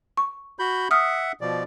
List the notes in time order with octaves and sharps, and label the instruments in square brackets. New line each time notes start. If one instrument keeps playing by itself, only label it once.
[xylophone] C#6
[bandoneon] F#4 B5 G6
[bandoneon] E5 F#5 [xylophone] D#6 F6
[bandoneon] B2 F3 D5